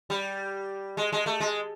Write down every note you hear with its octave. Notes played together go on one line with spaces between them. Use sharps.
G3
G#3
G#3
A3
G#3